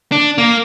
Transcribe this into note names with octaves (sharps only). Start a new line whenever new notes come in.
D4
A#3